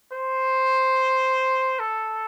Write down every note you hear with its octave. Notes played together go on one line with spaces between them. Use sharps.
C5
A4